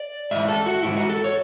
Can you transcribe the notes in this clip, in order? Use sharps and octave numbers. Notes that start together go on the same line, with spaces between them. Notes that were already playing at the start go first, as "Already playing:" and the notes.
Already playing: D5
G#2 E3 E5
A4
F#4
G#2 E3 E4
F#4
A4
C#5